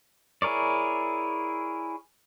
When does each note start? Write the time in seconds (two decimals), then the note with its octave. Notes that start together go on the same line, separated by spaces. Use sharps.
0.42 E4 G#4 A#4 C#5 D5